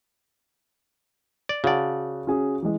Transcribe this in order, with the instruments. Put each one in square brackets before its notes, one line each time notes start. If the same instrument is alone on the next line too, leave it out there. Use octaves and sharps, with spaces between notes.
[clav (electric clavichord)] D5
[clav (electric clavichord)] C#3 D5 [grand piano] F#4 F#5 A5
[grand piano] C#4 F#4 G#4
E3 G#3